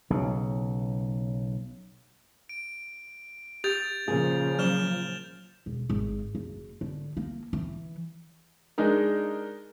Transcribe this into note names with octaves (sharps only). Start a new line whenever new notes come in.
B1 C#3
D7
G4 G6 A6 F7
A#2 C#3 F3 G#4
F#3 F6 E7 G7
E1
G#1
F#1
D3
A#3
E3
G#3 D4 D#4 A#4